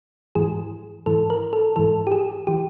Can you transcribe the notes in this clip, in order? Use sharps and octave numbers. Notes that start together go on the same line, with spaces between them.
G#2 E3 G#4
G#2 E3 A4
A#4
A4
G#2 E3 A4
G4
G#4
E3 G4